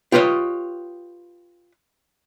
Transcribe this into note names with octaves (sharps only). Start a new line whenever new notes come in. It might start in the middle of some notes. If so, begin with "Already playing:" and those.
F4 G4 B4 C#5 D#5